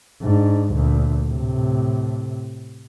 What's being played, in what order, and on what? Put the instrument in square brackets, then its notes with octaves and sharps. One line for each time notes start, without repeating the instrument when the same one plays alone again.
[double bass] G#2 D4
D2 A#2
A2 C3